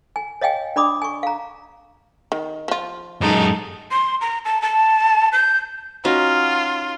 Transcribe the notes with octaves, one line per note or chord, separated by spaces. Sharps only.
G#5
C#5 D#5 F5 G5 G#5
D4 D5 B5 D6 D#6
G#5 C#6
F5 A#5
D#3
F3 F4
F#2 G#3 D#4 A4
C6
A#5
A5
A5
G6
C#4 D#4 F4 F#4